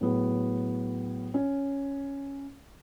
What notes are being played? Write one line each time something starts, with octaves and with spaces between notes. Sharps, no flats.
A2 F#3 B3 G#4
C#4